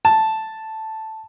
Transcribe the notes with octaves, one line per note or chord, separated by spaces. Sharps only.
A5